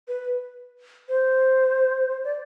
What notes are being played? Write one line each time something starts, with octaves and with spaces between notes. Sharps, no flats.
B4
C5
D5